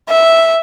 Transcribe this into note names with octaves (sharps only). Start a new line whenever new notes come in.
E5